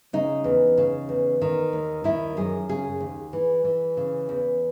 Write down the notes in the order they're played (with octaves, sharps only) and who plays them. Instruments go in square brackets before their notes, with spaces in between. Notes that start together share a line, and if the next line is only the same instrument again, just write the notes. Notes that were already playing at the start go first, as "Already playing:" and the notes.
[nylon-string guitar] C#3 D#4
E2
C#3
E2
D#3
D#2
D#3 E4
F#2 G#4
C#3 G#4
D#2
E3
E3
C#3
E2